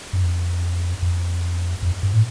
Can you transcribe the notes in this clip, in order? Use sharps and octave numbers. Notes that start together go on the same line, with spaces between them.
F#2
F2
F2
F2
G2
A2